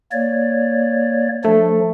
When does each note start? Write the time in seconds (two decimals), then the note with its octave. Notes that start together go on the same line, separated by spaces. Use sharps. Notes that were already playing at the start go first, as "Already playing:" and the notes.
0.12 A#3 C#5 D5
1.45 F3 A3 D4